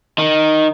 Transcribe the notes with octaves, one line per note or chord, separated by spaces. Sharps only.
D#3